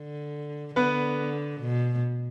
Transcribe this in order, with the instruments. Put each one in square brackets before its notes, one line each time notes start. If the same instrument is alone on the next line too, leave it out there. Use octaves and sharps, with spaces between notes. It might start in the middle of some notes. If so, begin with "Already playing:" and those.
Already playing: [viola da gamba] D3
[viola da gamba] D3 [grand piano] B3 B4
[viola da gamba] B2